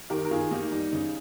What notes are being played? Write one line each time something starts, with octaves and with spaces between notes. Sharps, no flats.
D#3 G4 A#4
A#4
D#3 F4 G#4
A#3 D#4 G4
G3 D#4
C#3 D#4